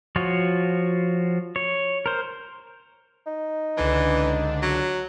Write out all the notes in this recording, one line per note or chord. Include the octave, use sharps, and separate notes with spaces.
F3 F4 F#4 C#5
C#5
A#4 C5
D#4
C#2 D3 E3 D4
F#3